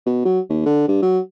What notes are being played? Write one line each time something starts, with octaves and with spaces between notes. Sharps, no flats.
B2
F#3
D#2
D3
G2
F#3